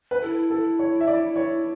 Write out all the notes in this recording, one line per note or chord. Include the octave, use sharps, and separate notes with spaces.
B4
E4 A4
A4
C#5
E5
D5
C#5